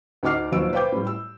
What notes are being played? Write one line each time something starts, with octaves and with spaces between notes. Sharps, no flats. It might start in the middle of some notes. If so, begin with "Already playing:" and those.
D2 D#4 F#5 D6 F6 C7
D#2 B2 F3 F#3 E6 D7
B4 C5 F5 G5 D6 G6
A2 G3
E6